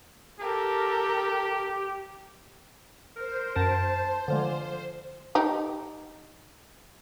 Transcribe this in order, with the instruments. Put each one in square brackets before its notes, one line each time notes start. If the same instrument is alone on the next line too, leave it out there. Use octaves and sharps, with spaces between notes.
[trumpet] G4 [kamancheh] A4 A#4
[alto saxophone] A#4 [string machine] C5
[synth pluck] F#2 A#4 [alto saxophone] A5
[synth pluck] D3 F3 G#3 [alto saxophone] F4
[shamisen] D#4 G4